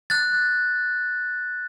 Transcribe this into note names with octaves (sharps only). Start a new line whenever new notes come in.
F#6 A6